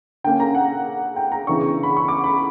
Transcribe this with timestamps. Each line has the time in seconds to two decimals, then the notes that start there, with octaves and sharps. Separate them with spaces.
0.24 D3 A#3 C#4 G5
0.40 A#5
0.55 F#5
1.16 G5
1.32 A#5
1.47 C#3 E3 B3 D4 C#6
1.83 B5
1.97 C#6
2.08 D6
2.24 B5